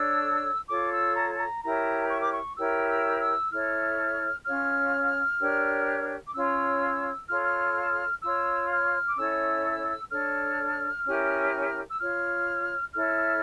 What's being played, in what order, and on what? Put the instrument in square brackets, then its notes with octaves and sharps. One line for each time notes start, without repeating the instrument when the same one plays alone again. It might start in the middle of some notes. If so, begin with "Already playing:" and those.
Already playing: [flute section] D4 A4 C#5 E6
F4 A4 C#5 D6
E6
A#5
A5
A#5
E4 G4 A#4 C#5 A#5
C#6
D6
C#6
E4 G4 A#4 C#5 E6
E6
E6
E4 A4 C#5 F6
C#4 F4 C#5 F6
D4 G4 A#4 C#5
D6
C#4 F4 C#5 E6
F4 A4 C#5 F6
F6
F4 C#5 E6
F6
D6
C#4 E4 A4 C#5 E6
D4 A4 C#5 F6
C#4 E4 G4 A#4
E6
F4 C#5 F6
E4 A4 C#5 F6